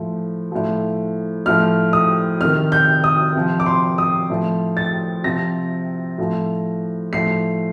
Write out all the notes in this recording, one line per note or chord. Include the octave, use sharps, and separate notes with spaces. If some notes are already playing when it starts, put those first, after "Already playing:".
Already playing: A2 F3
A2 F3
A2 F3 F6
D#6
C3 D#3 F6
G6
D#6
C3 F3
D6
C6
D#6
A2 F3
A6
C3 F3 A#6
A2 F3
A2 F3 C7